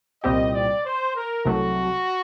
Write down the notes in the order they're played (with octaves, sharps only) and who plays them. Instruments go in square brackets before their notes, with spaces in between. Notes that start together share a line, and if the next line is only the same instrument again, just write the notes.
[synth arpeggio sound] C2 A#2 G3 C4 G4 [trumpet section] D#5
[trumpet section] D5
C5
A#4
[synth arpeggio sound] C2 C3 F#3 A3 [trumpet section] F#4